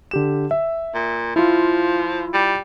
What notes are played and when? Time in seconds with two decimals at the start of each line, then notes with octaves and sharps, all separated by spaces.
0.11 D3 G4 E7
0.51 E5
0.94 A#2
1.36 F3 E4 F4
2.34 G3